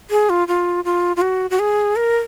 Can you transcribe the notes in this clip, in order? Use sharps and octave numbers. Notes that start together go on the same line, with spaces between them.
G#4
F4
F4
F4
F4
F#4
F#4
G#4
A#4